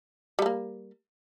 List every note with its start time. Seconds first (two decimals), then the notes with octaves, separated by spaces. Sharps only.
0.39 G3
0.42 A3
0.46 A#3